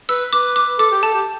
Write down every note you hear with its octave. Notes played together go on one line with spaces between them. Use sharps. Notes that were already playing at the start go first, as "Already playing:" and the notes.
B4 E6
B4 D6
D6
A4 D6
G4
A4 A5
G4